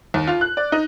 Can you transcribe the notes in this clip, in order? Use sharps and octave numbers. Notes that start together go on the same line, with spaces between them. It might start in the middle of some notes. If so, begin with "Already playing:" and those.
D#2
F4
F#6
D5
D#4